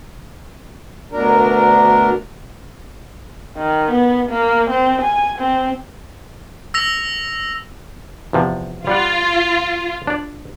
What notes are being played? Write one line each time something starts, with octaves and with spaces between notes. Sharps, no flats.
D2 B2 D4 A#4
D#3
B3
A#3
C4
G#5
C4
E6 A#6 F7
E2 C3 F3
G3 F4 D5 F#5
D4 D5